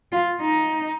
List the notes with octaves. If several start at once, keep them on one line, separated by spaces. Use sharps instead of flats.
F4
D#4